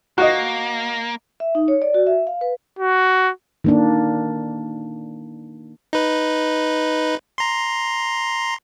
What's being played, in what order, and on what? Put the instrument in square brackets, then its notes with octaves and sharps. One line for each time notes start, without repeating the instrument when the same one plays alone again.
[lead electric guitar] A#3 [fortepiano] F#4 D#5
[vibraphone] E5
D#4
C#5
D5
F#4
E5
F5
B4
[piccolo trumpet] F#4
[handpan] D#3 A#3 D4
[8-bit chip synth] D#4 B4
A#5 C6